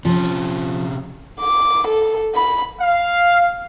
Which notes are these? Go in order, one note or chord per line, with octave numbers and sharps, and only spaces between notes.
C3 F3 C#4
D6
A4
B5
F5